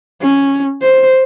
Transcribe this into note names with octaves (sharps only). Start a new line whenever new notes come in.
C#4
C5